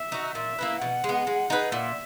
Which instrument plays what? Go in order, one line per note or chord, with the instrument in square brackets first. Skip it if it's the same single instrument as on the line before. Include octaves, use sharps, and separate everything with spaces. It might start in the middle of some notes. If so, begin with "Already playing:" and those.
Already playing: [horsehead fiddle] E5
[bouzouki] D#4 F#4
[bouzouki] A#2 [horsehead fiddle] E5
[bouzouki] A#3 E4 B4
[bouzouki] B2 [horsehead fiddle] F#5
[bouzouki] G#3 B3
G#3
D#4 G#4 B4
[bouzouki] A#2 [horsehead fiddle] E5